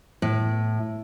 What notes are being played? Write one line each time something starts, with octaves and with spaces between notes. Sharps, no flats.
A2